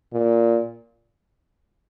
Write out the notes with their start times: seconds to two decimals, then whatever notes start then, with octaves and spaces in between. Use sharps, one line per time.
0.13 A#2